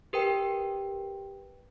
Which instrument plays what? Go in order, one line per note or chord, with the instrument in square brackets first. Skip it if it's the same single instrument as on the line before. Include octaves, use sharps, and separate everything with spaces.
[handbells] G4 A#4 B4 G5